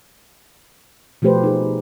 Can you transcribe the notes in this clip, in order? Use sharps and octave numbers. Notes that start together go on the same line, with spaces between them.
B2 F3 A3 G4 B4 C5
D#4 G#4